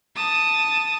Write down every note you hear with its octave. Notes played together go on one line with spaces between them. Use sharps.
A5 D#6